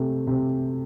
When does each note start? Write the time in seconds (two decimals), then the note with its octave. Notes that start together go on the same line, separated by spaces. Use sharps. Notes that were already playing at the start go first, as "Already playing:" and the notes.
Already playing: C3 A3
0.27 C3